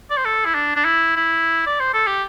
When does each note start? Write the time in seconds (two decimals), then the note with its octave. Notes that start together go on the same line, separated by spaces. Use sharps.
0.10 D5
0.17 C5
0.25 A4
0.45 E4
0.55 D4
0.76 D4
0.85 E4
1.16 E4
1.66 D5
1.80 C5
1.94 A4
2.07 G4